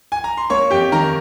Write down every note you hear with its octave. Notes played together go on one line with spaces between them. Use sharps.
G#5
A#5
C6
A#3 C#5 C#6
F2 G4 G5
D#3 A#4 A#5